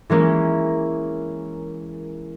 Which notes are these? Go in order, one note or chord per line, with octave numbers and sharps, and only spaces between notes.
E3 G#3 A#3 C#4